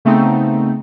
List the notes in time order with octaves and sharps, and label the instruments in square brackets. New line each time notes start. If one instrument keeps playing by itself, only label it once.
[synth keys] C#3 A3 B3 C4 D#4